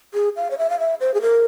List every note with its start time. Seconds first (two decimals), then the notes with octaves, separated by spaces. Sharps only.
0.14 G#4
0.36 F5
0.51 C#5
0.58 E5
0.70 F5
0.80 E5
1.01 C5
1.14 G#4
1.22 A#4